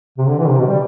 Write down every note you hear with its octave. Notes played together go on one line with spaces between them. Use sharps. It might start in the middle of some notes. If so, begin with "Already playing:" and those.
C3
D3
E3
C3
B2
G3